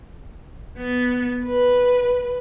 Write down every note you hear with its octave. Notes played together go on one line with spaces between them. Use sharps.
B3
B4